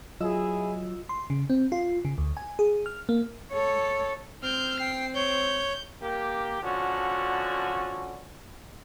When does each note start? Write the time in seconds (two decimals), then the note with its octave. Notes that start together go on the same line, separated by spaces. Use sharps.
0.21 F#3 E4 F4 G#4 D#5 E6
1.09 C6
1.30 C#3
1.50 C4
1.72 F4
2.05 C#3
2.18 D2
2.37 G#5
2.59 G#4
2.86 F6
3.09 A#3
3.52 A4 C#5
4.43 C4 F6 G6
4.80 G5 C7
5.15 C#5 G6
6.02 A#3 G4
6.62 D3 F3 C#4 F#4